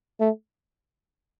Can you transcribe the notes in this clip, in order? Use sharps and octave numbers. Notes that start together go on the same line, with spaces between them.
A3